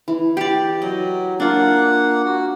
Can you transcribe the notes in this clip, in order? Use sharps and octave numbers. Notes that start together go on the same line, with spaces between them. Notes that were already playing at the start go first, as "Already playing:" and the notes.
E3
G4 D5
F#3 D#5
A#3 D4 F4 F#5
F#4